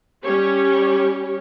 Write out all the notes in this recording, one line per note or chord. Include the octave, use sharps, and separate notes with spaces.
G3 C#4 G4 C#5